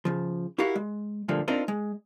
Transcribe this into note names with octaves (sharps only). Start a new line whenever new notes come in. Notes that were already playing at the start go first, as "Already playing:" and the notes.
C#3 F3
E4 F#4 G4 A#4 F5 F#5
G#3
G2 A#2 D3 F3 A3 A#3
C4 D4 D#4 F4 A#4 C5
G#3